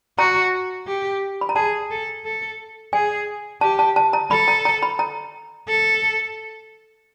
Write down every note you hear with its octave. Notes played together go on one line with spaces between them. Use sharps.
F#4 A#5
G4
B5
A#5
G#4 A5
A4
A4
G#4 G#5
G4 A5
A5
A5
A#5
A4 B5
A#5
A#5
B5
A#5
A4